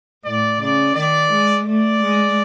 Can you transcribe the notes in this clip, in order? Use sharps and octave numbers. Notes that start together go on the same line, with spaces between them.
A2 D5
C#3 D5
D#3 D5
G#3
A3 D5
G#3